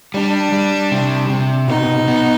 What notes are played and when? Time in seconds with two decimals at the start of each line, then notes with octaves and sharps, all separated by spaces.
0.14 G3 D4
0.52 G3
0.91 C3
1.30 C3
1.68 B2 D#4
2.08 B3